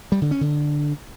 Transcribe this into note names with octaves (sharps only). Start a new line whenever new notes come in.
G3
D3
C#4
D3